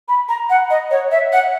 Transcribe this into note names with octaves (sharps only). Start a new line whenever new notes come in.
B5
A#5
F#5
D#5
C#5
E5
F#5